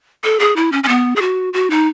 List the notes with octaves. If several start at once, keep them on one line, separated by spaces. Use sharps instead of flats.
A4
G#4
E4
C#4
C#4
B3
G#4
F#4
F#4
D#4